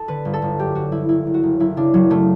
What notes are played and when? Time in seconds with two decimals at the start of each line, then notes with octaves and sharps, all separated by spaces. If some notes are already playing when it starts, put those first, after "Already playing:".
Already playing: A4
0.08 D3 B4
0.25 G1
0.34 A4
0.42 G1
0.59 F#2 G4
0.75 G1 F#4
0.92 G1 E4
1.09 F#1 E4
1.27 F#1
1.34 F#4
1.43 F#1
1.60 F#1 E4
1.77 C#3 D4
1.94 F#1 F#3
2.10 C#3 A3